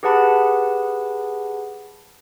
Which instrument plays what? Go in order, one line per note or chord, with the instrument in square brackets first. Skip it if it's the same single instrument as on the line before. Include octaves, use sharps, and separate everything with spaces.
[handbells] G4 G#4 B4 F#5 A5 B5